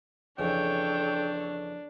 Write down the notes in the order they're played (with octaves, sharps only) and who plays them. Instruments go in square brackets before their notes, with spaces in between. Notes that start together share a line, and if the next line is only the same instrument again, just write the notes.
[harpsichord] F2 C#3 E3 [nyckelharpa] D4 [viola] A4 C#5 [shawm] G5